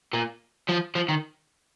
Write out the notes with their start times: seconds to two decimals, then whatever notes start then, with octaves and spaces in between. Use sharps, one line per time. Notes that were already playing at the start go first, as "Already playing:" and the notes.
0.13 A#2
0.69 F3
0.95 F3
1.09 D#3